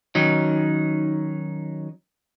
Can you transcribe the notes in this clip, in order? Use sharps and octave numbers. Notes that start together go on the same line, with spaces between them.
D#3 F#3 C#4 D#4